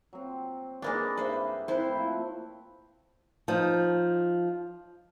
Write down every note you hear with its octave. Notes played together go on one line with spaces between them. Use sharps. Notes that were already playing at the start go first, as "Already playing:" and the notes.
F#3 C4
G#3 A#3 D4 D#4 A#4 B4
G2 E4 B4 C5
C4 E4 B4 C5
F3 A3 A#3
F3 D#4